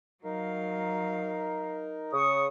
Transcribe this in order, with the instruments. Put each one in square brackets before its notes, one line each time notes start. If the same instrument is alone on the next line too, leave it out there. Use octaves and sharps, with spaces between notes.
[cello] F#3 F5 [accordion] D#4 A#4
[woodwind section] C#3 D#6 [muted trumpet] C#6